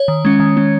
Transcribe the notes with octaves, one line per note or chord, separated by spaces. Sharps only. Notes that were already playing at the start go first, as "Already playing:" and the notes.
Already playing: C#5
D#3
G#3 C#4
D#3
G#3 C#4